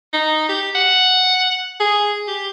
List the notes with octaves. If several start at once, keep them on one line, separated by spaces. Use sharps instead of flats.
D#4
G4
F#5
G#4
G4